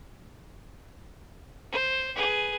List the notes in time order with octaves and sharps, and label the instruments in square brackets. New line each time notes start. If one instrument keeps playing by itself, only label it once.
[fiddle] C5
G#4 B4